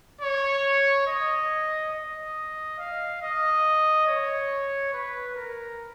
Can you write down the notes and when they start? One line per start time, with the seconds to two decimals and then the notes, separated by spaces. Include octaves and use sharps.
0.21 C#5
1.07 D#5
1.93 D#5
2.78 F5
3.22 D#5
4.07 C#5
4.93 B4
5.36 A#4